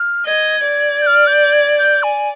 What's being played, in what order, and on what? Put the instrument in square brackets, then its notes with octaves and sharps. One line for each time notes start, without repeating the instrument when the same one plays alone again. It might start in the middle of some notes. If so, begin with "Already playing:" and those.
Already playing: [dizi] F6
[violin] D#5 [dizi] G#6
[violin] D5
[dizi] G6
F6
G6
G#6
G6
G#5